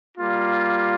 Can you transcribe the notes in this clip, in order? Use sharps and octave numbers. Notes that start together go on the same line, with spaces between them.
G3 A#3 F4